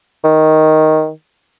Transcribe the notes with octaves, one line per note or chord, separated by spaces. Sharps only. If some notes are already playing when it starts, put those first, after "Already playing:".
D#3